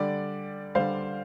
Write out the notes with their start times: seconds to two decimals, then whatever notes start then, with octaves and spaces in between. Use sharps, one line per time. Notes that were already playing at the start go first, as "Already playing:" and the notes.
Already playing: D3 G3 D5
0.75 D3 G3 C5 F5